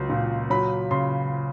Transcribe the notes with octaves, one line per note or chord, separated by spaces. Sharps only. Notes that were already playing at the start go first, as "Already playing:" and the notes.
Already playing: C#2 F#3
A#2
F#3 B5
C#3 C6